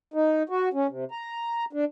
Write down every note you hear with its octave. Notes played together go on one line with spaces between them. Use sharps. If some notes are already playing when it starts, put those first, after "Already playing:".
D#4
F#4
C#4
C3
A#5
D4